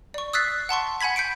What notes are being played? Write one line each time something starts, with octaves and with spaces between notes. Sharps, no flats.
D5 C#6
D#6 E6 F#6 A6 B6 C7
F#5 A5 C6 C#6
F#5 G#5 B5 G#6 B6
G6 B6 C#7 D7